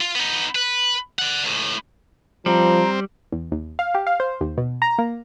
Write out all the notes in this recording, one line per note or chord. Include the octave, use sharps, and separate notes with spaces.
F4
B3 D#4
B4
D5 F#5
C#2 A2
F3 G3 C4 A#5
E2
D#2
F5
G4
F5
C5
D#2
B2
A#5
A#3